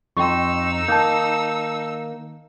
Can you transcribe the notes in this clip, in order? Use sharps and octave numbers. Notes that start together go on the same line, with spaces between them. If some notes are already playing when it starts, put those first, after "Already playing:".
F2 D#4 G5 C6 C#6 E6
D#3 A#3 A5 D#6 G6